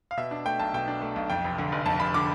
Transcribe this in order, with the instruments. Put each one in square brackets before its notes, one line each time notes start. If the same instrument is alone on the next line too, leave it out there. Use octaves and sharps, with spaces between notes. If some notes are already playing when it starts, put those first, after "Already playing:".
[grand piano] F5
B2 E5
D4
A3 G5
B1 A5
B2 G5
D4
A3
B1
F2 G5
F1
D3
F1
F2 A5
F1 B5
D3 D6